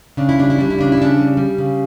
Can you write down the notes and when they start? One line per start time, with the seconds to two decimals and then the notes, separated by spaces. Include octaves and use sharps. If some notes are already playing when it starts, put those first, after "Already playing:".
0.17 C#3 D4
0.29 E4
0.38 G3 D4
0.50 E4
0.58 G3 D4
0.70 E4
0.78 C#3 D4
0.92 E4
0.97 C#3 D4
1.18 G3
1.37 G3
1.58 C#3